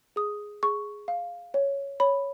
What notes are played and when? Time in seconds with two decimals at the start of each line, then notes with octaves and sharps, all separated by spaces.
0.16 G#4 D#6
0.63 G#4 C#6
1.08 F5
1.54 C#5
2.00 C#5 B5